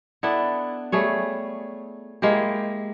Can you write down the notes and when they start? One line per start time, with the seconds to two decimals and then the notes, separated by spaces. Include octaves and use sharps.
0.23 B3 D4 E4 A4
0.92 G3 A3 G#4 C#5
2.22 G#3 A#3 E4 G4